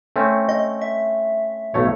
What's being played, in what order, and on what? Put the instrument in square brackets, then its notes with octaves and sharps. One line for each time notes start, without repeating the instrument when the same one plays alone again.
[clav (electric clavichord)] A3 C4 C#4
[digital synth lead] D#5
E5
[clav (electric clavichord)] B1 A3 C#5